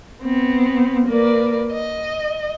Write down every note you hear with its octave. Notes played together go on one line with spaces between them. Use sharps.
B3 C4
A#3 A#4 B4 D5
D#5